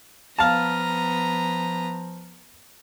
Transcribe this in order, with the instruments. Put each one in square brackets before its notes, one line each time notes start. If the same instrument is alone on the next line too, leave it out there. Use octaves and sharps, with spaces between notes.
[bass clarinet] F3 [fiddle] B3 A#5 [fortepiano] F5 A5